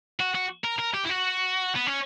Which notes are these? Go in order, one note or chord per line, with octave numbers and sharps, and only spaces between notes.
F#4
F#4
A#4
A#4
G4
E4
F#4
B3
C#4